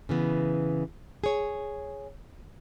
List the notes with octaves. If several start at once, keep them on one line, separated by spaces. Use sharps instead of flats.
C#3 E3 B3
G#4 C#5